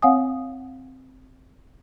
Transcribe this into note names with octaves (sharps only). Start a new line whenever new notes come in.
C4 C#5 F5 F#5 G#5 D#6